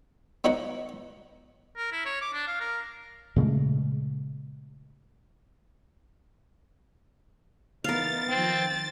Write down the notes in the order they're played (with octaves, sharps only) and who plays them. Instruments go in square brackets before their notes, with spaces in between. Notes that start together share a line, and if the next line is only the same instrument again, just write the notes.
[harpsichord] B3 D#4 F#4 C#5 D#5 F#5
[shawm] A#4
E4
C#5
D6
D4
F5
A#4
[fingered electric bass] A#2 C#3 G#3 A3
[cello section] E3 B3 D#4 [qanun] A#4 F5 [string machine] A6
[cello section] D#3 F3 [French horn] C4